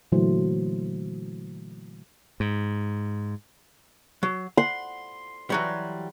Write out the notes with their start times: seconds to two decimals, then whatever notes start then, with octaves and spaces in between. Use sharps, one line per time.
0.12 A#2 D3 E3 F#3 A3 C5
2.40 G#2
4.23 F#3
4.57 F#5 C6
5.50 E3 F#3 G3